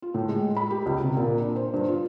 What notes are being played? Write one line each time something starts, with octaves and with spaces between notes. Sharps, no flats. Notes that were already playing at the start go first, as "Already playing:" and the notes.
F4
A2
G#3
B5
G4
C#2
C3
A#2
D4
C5
G2
F4